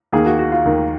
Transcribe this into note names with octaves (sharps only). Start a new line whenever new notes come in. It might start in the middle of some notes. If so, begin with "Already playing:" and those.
D#2 D#3 A#3 G#4
F#4
F#4
F4
D#2 D#3 A#3